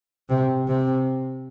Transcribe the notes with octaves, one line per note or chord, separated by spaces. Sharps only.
C3
C3